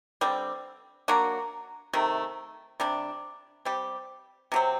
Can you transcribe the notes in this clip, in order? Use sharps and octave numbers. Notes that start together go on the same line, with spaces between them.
D3 G3 C4
F#3 A#3 D4 F#4
C3 D#3 A3
C3 G3 D4
G3 C4 G4
C3 F#3 C4